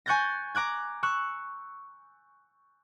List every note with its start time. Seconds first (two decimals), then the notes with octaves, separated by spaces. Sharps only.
0.06 G#5 C#6 F#6 G6 A6 A#6
0.55 A#5 D6 F#6 G#6
1.03 C#6 E6 F#6